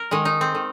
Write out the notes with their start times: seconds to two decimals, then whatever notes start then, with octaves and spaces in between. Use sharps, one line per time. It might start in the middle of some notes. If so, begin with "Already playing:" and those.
Already playing: A#4
0.11 D#3 G#3
0.25 D#4
0.41 C4
0.55 D#3